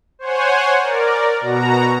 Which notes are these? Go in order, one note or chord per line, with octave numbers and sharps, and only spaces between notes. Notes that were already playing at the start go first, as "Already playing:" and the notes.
C5 C#5 F#5 G#5
A#4 D5
B2 F#4 A#5